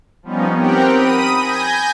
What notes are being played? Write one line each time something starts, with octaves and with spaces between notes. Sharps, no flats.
F3 G3 B3 C#4 D#4
C4 G4 A#4 F#5 G5
B5 D#6 D#7
G#5 G6 A#6